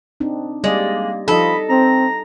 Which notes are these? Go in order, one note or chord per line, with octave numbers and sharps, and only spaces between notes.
C4 D4 D#4
G3 G#3 A#3 D5 D#5
F3 D#4 A4 D#5 B5
C4 A#5